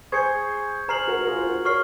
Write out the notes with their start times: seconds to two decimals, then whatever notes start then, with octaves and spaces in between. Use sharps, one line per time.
0.12 G#4 C5 C#6 G#6 C#7
0.88 G#4 C5 A#5 F6 C7 F#7
1.08 F#4 A#4
1.21 A#4
1.28 F4 G#4
1.37 C5
1.46 F#4 A#4
1.65 A#4 C#5 C#6 F6 C7